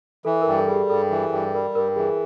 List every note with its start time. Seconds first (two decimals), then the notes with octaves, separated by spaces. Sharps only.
0.25 E3 A4
0.42 A#4
0.47 G2
0.58 A4
0.68 G3 G#4
0.74 G4
0.90 G2 A4
1.10 E3
1.32 G2
1.54 G3 A#4
1.75 G2 A#4
1.96 E3 G#4